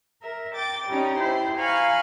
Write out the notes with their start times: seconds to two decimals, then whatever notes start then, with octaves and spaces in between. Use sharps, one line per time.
0.22 A#4 E5
0.54 G5 D6 A6
0.88 G3 C#4 D#4
1.19 E4 C5
1.58 F5 G#5 A#5 B5 C#6 F6